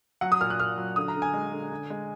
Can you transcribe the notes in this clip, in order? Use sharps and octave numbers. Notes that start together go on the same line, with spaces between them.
F#3 F#5
D#6
A#2 F6
F#6
A#2 F6
F#3
D3 D#6
A#5
D3
G#5
G#3
D3
D3
G#3